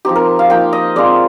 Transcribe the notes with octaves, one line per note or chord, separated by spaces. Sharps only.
F3 C4 D#4 G4
A#4
F5
F3 A#3 D#4 G5
D#5
G#3 C4 F4 D5